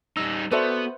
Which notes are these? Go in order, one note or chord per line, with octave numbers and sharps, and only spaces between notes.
G3 D#4 E6
B3 F#4 A4 B4 C5 D5 E5